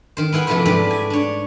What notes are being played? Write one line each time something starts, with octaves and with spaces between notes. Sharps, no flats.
D#3 C5
B3 E4 G#4 F#5 G5
C3 F3 A3 A#3 B4 C5
G#2 A3 G4 B4 D5
G#5
D4 C#5